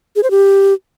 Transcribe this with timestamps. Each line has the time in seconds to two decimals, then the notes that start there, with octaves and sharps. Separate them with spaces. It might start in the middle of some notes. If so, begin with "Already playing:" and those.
0.16 G#4
0.23 C5
0.31 G4